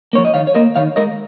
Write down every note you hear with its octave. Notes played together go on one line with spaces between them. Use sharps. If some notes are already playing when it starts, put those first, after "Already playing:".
F3 A#3 C#5
D#5
D#3 C#5 F5
C#5
A#3 A#4 D#5
D#3 C#5 F5
G#3 A#4 D#5